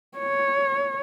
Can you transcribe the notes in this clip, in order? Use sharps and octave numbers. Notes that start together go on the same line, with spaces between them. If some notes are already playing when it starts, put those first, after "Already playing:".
C#5